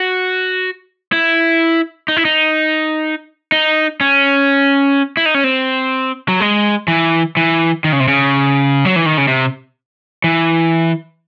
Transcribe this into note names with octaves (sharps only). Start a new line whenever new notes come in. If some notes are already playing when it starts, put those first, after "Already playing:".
Already playing: F#4
E4
D#4
E4
D#4
D#4
C#4
E4
D#4
C#4
C4
F#3
G#3
E3
E3
D#3
C#3
C3
C#3
F#3
E3
D#3
C#3
C3
E3